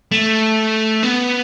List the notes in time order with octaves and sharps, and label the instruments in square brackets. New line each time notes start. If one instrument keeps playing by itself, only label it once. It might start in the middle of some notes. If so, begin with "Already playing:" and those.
[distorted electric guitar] A3
B3